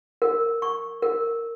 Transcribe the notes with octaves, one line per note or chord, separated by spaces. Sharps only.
A#4
C#6
A#4